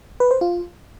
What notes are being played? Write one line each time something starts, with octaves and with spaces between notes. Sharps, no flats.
B4
C5
F4